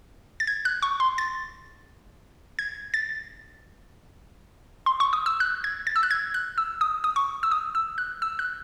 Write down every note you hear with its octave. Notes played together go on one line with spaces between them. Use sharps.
A6
G#6
F#6
C#6
C6
A6
G#6
A6
C6
C#6
D#6
E6
F#6
G#6
A6
E6
F#6
G#6
F#6
E6
D#6
D#6
C#6
E6
D#6
E6
F#6
E6
F#6